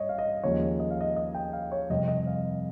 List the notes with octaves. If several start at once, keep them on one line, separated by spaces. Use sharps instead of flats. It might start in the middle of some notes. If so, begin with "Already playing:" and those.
Already playing: G2 G3 C#5 D#5
F5
D#5
D#2 C#3 F3 G#3 C#5
D#5
F5
D#5
D#5
G5
F5
C#5
F2 C3 G3 C4 D#5
D#5
F5